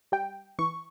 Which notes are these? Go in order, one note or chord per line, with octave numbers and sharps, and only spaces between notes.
G3 G5
E3 C#6